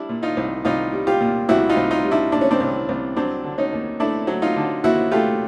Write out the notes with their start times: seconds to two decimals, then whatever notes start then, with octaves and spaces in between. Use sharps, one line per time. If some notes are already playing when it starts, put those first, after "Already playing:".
Already playing: G3 D4 E4
0.09 A#2
0.23 D#4 F4
0.37 C2
0.65 C2 D#4 F4
0.93 G3
1.07 F4 G4
1.21 A#2
1.49 C2 E4 F#4
1.69 D#4 F4
1.77 C2
1.91 D#4 F4
2.04 G3
2.11 D4 E4
2.32 A#2 D4
2.41 C#4
2.51 C4 D4
2.60 C2
2.89 C2
3.16 F#3 C4 D4
3.44 D3
3.58 C#4 D#4
3.72 D#2
4.00 A3 D4 E4
4.27 F#3
4.42 D#4 F4
4.56 D3
4.84 D#2 E4 F#4
5.11 A3 F4 G4